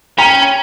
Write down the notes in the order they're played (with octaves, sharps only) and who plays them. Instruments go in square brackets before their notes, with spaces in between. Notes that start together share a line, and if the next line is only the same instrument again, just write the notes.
[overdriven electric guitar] C#4 [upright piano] G5 A#5